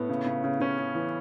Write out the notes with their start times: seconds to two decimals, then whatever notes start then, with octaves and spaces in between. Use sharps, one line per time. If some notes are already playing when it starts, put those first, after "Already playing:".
Already playing: A2 B3
0.09 C#3
0.26 C#3
0.44 C#3
0.60 C#3 C#4
0.78 C#3
0.95 E3